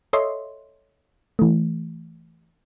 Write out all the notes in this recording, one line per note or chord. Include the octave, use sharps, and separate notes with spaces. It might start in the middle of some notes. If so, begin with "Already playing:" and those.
A4 C#5 D#5 E5 C6
E3 A3